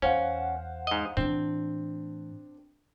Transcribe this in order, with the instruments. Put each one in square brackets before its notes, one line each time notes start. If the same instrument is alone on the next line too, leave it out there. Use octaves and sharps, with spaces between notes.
[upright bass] E2 [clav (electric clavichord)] C#4 [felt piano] C5 F5 F#5
[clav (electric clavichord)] G#2 D#5
[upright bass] A2 E3 [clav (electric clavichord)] C4 [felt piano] D4